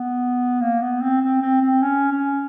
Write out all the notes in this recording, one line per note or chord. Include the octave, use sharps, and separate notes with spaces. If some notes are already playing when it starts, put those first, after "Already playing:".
Already playing: B3
A#3
B3
C4
C4
C4
C4
C#4
C#4